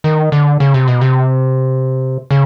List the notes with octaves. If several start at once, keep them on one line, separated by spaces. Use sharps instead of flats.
D#3
D3
C#3
C3
B2
C3
C#3